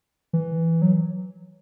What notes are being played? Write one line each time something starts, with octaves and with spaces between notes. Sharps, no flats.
E3
F#3